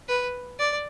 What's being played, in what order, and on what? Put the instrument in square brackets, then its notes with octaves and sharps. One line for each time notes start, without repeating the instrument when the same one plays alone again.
[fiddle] B4
D5